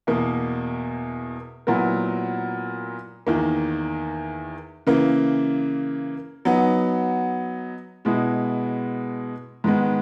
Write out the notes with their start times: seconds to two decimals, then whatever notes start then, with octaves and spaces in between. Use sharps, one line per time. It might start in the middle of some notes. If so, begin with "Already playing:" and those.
0.07 E2 B2 A#3
1.67 A#2 F#3 B3 E4 A#4
3.27 E2 D#3 A#3
4.87 C#3 E3 A#3
6.45 F#3 B3 D#4
8.05 B2 G#3 B3 E4
9.64 G#2 D#3 G#3 B3